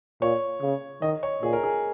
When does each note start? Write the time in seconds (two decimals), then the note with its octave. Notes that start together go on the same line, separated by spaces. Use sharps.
0.22 A#2 C#5
0.62 C#3
1.02 D#3 D#5
1.23 C#5
1.42 A#2 G#4
1.53 A#4
1.63 G#4